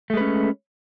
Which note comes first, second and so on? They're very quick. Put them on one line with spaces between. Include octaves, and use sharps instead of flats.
A3 G#3 B4 C#4